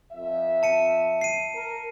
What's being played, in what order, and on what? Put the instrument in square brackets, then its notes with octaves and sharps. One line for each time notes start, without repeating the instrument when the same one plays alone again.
[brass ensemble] F2 E5
[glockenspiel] A5 C#7 D#7
C7 D#7
[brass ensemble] A#4